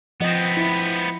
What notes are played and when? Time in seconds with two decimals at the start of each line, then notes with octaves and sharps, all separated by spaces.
0.20 F3 B3 C4 D#5
0.57 E4